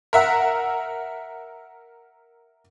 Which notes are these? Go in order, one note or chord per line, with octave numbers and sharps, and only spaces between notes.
A#4 E5 F#5